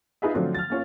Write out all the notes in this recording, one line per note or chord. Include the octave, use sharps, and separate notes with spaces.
D#4 F4 G#4 B4 D#5 E5
D3 F3 F#3 A3 C4 D4
F6 A6
A#3 C#4 F4